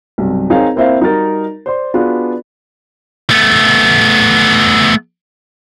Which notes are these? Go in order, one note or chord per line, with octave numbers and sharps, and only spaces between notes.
B1 G2 C3
C4 D#4 G#4 A#4 C#5 F5
A#3 C4 E4 C5 E5 F5
G3 D#4 F#4 A#4 A6
C5 D5 C6
B3 D4 F4 F#4 G#4 B4
A3 B3